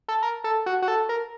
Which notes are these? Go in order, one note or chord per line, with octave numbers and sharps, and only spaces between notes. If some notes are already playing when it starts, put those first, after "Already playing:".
A4
A#4
A4
F#4
F#4
A4
A#4